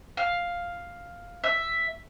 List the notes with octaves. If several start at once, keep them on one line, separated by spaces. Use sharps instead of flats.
F5
E5